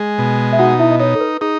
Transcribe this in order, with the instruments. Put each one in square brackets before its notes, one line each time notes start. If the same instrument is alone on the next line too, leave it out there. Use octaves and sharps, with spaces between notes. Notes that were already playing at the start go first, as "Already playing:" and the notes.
Already playing: [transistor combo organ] G#3 [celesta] G#4 G#5
[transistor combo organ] B2
[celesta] E5
[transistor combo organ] D#4 [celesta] F#4 F#5
[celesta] E4 E5
D#5
[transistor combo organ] D#4 [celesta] C#5
[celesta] A4
B4
[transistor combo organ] D#4 [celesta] G#4